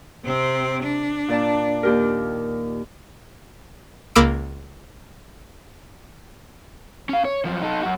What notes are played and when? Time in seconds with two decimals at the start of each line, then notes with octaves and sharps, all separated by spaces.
0.25 C3 C4
0.83 D4
1.28 A#2 D5 A5
1.83 D#2 G4 A#4
4.15 C#2 A#3 B5 D6 E6 D7
7.09 C#4 F5
7.25 C#5
7.45 F#2 F3
7.62 D#4 A4
7.83 F#2 F#4